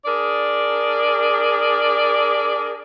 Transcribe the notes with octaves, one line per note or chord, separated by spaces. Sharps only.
D4 G#4 A#4 D5